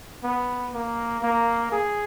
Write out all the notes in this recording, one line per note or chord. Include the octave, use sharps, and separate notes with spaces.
B3
A#3
A#3
G#4